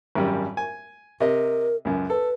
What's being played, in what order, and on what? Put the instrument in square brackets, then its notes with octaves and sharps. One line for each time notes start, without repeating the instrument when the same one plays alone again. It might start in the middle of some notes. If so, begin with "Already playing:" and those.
[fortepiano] G#1 F#2 G3
G#5
[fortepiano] C3 D#5 [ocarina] A#4
[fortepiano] C#2 F#2
[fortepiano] A4 [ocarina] B4